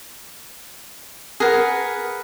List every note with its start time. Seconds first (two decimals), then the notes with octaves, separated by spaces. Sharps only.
1.40 G#4 A#4 B4 F#5